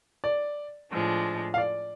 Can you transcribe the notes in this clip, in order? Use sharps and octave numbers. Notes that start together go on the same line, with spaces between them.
D5
A2 F3 G#3 D4
F5
D5